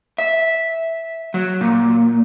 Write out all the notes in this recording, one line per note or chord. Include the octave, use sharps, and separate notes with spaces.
E5
F#3
A#2